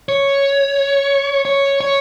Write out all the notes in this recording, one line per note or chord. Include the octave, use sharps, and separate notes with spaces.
C#5
C#5
C#5